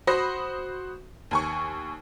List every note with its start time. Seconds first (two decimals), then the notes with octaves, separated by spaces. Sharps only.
0.07 F#4 C5 B5 D#6 A#6
1.31 D#2 G#5 C#6